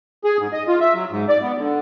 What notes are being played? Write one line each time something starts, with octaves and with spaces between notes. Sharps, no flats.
G#4
G#2
D#5
F4
E5
F#3
G#2
D5
B3
D3